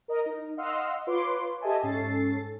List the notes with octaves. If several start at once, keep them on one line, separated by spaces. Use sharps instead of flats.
A#4 D#5 A#5
D#4
D#5 F5 F#5 C6 E6 F6
F4 B4 C#5 C6 D6
G4 A4 D#5 E5 G#5 A5
G#2 C#4 A4 A6 C7